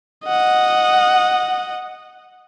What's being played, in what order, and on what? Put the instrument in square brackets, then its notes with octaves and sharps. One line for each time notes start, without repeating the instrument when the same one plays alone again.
[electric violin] D#5 F#5